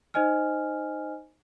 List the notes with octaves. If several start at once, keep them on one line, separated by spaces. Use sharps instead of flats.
D#4 C5 D#5 G#5 F6